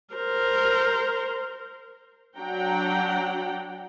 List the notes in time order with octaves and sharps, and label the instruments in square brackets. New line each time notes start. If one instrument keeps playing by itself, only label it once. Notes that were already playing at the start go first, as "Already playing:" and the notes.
[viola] A#4 C5
[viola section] F#3 D4 F#5 G5 A#5